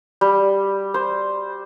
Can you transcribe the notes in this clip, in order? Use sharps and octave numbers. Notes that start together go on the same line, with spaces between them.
G3
C5